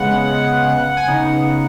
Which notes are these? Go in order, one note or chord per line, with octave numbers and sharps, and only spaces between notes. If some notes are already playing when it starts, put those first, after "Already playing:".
Already playing: C#3 G#3 B3 F#5
G#5
C#3 B3 D#4 F#5